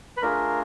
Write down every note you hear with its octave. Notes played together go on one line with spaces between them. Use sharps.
B4
A3 D4 F4 G#4 A#4